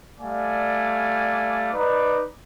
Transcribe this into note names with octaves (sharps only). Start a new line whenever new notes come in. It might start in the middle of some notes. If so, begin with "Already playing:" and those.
G3 A3 D5 F5 G5 G#5
D#4 B4 D5